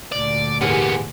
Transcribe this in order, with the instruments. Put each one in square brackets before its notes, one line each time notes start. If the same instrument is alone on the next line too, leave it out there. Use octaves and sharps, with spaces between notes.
[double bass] D2 A#2 [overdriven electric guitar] D5
[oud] E2 G#2 G4 [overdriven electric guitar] A#3 B3